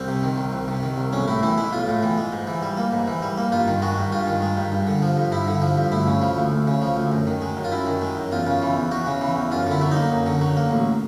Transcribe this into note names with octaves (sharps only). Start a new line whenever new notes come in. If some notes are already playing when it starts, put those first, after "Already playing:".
Already playing: C2 C4
C3
D#3
C2
C2
C3
D#3
C2
B1 C#4
A2 E4
E3 E4
G#3 E4
B1 F4
A2
E3
G#3
G#2
E3
G3
A#3
G#2
E3
G3
A#3
G2 F4
D#3
G#3 F#4
G2
G2 F4
D#3
G#3
G2
G2
D3
F3
G2
G2 E4
D3
F3
G2
D2 E4
C#3
F3
D2
D2
C#3
F3
D2
F#2
D#3
G#3
F#2
F4
F#2 E4
D#3
G#3
F#2
E2 F4
C#3
E3
E2
E2 F#4
C#3
E3
E2
F#2 F4
D3 E4
F#3
D#4
A#3
F#2
D3
F#3
A#3
A1